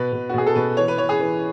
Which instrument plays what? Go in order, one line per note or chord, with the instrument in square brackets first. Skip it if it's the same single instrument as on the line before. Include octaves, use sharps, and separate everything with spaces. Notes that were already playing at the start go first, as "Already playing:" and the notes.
Already playing: [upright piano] B2 B4
B2
F#4
B2 G#4
A4
B2 B4
E3 C#5
B4
E3 C#5
G#4
E3